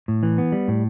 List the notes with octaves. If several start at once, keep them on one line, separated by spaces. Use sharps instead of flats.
A2
E3
B3
G3
A2